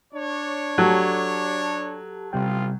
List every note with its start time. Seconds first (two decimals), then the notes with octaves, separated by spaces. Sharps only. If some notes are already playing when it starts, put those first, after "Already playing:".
0.14 D4 C#5
0.78 F#3 G4 A4 A5
2.33 A1 C3 G3 F4 G5